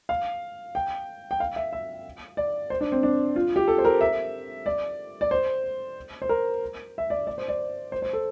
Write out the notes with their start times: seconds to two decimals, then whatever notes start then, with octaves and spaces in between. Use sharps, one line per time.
0.09 F5
0.75 G5
1.31 G5
1.40 F5
1.56 E5
1.73 E5
2.37 D5
2.70 C5
2.81 D4
2.92 C4
3.03 D4
3.36 F4
3.56 G4
3.68 A4
3.78 C5
3.85 A#4
4.01 E5
4.66 D5
5.21 D5
5.31 C5
6.22 C5
6.29 A#4
6.98 E5
7.10 D5
7.27 D5
7.38 C5
7.48 D5
7.92 C5
8.02 C5
8.13 A4